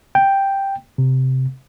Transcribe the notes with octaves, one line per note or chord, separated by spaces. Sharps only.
G5
C3